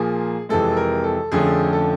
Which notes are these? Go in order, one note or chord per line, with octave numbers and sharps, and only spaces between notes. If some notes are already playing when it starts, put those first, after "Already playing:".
Already playing: A#2 F3 A#3 G#4
F2 C3 E3 G#3 A4
A#4
A4
F2 D3 F3 A3 C#4 G#4
A4